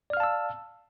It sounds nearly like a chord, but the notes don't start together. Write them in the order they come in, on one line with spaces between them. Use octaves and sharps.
D5 F6 F5 A5 E6